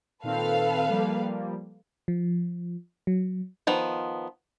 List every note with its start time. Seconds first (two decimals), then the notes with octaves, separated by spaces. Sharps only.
0.23 A#2 D#3 C4 A4 B4 F5
0.90 F3 G3 A#3
2.08 F3
3.07 F#3
3.67 D#3 F3 B3